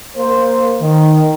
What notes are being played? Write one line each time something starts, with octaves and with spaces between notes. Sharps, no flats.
A#3 C5
D#3